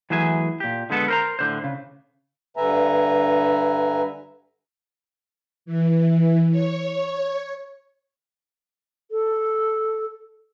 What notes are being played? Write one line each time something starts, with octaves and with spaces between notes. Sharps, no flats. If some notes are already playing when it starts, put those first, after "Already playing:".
E3 F#3 A3 G#4 E5 G#5
A#2 G4
D3 G#3 B3 A4
A#4 C5 A#5
A2 D3 C5
C#3
G2 D3 B4 E5 G#5 A#5
E3
C#5
A4